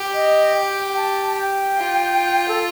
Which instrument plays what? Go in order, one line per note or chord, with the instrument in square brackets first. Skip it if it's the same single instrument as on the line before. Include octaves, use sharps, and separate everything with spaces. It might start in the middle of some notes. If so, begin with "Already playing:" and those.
Already playing: [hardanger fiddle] G4
[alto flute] D#5
G5
G5
A5
A5
G5
[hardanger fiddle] F4
[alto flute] A4